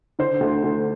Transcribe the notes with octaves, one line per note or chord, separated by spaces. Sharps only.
D3 C5
D2
D2